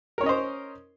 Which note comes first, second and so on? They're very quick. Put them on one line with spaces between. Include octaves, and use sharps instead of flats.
A#4 C#5 C#4 D#5 C5